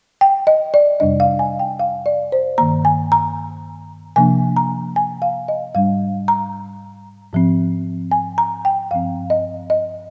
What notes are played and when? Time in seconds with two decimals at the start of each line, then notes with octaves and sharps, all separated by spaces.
0.21 G5
0.47 D#5
0.74 D5
1.00 F2 C3 G3 D4 D#5
1.20 F5
1.39 G#5
1.59 G5
1.79 F5
2.06 D5
2.32 C5
2.58 G2 D#3 A#3 A#5
2.85 G#5
3.12 A#5
4.16 C3 F3 A#3 D4 G#5
4.56 A#5
4.96 G#5
5.22 F5
5.48 D#5
5.75 G#2 G3 D4 F5
6.28 A#5
7.33 G#2 F3 C4
8.11 G#5
8.38 A#5
8.65 G5
8.91 G2 F3 C4 F5
9.30 D#5
9.70 D#5